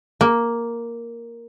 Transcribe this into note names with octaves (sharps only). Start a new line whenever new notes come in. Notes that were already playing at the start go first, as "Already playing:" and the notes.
A#3